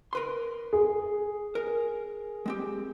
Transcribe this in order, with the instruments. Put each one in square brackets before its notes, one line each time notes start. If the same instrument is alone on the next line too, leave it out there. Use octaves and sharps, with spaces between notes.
[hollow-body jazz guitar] A#4 B4 C6
[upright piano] G#4
[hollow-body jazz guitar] A#4
G#3 C4 G4